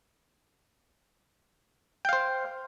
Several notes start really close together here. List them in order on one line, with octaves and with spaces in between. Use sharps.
G5 F5 C5